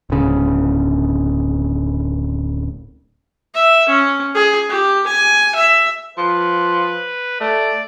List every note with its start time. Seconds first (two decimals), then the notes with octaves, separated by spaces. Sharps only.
0.10 D1 C#3
3.54 E5
3.89 C#4
4.35 G#4
4.69 G4
5.07 G#5
5.55 E5
6.17 F3 B4
7.41 A3 D5